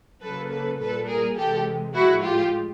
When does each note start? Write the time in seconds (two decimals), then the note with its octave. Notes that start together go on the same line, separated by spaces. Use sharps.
0.21 C#3 F#3 A#3 A4 B4
0.50 A4 B4
0.79 A#2 G3 A#3 A4 B4
1.08 G#4 A#4
1.36 C3 E3 G#3 G4 A4
1.94 A2 F3 G#3 E4 F#4
2.23 F4 G4